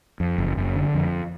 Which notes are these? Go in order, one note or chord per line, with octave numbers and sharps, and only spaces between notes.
F2
F#1
F#1
D3
F2